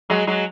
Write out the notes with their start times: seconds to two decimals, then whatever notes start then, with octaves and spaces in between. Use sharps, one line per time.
0.10 F#3 G#3
0.27 F#3 G#3